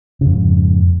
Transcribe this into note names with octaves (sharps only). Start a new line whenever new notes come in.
F2 G#2 C#3